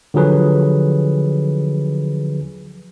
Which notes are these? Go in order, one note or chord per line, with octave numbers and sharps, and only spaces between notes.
D3 F3 F#3 G#4 B4